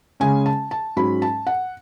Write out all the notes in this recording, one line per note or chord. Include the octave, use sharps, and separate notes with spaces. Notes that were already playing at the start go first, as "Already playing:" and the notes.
C#3 G#3 C#4 G#5
A5
A5
G#2 F#3 C#4 B5
A5
F#5